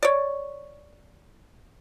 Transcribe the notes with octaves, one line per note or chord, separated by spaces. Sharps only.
C#5 D5